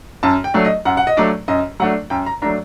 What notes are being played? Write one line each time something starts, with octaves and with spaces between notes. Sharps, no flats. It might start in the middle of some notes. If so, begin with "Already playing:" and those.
F#2 A5
G5
F#3 A3 D4
D#5
F#2 F#5
F#5
D#5
F#3 A3 D4 D5
F#2 D#5
F#3 A3 D4 F#5
F#2 G5
A#5
F#3 A3 D4 A#5